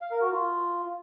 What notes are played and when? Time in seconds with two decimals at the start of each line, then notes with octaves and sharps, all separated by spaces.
0.02 F5
0.11 A#4
0.21 F#4
0.31 F4